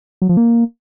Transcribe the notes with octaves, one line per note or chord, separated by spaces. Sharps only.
F#3
F3
A#3